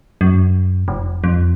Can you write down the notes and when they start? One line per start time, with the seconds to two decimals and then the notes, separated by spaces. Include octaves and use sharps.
0.21 F#2
0.88 F1
1.24 F2